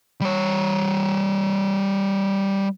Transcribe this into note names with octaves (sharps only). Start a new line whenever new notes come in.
G3 C#5